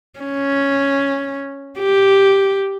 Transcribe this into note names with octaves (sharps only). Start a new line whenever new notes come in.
C#4
G4